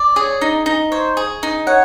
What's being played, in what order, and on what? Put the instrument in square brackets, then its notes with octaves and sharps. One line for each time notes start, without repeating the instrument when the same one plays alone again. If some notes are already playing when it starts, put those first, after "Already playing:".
Already playing: [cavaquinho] D5
[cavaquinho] G#4 [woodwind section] C#5
[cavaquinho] D#4
D#4
[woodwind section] C5 [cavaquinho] C#5
[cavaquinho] G#4
D#4
[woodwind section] C#5 [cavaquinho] F#5